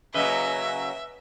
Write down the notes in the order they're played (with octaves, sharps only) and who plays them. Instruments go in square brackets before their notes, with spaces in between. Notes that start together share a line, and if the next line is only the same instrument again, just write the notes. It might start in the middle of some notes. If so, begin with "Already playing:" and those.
[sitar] C#3 F#3 A#3 [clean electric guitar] B4 D#5 [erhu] E5